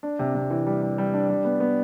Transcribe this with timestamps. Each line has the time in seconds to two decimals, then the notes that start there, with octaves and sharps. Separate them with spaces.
0.03 D4
0.19 C3
0.35 C3
0.50 E3
0.66 G3
0.82 G3
0.98 G3
1.14 D4
1.29 G3
1.44 B3
1.60 B3